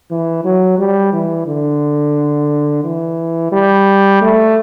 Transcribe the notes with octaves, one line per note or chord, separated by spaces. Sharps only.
E3
F#3
G3
E3
D3
E3
G3
A3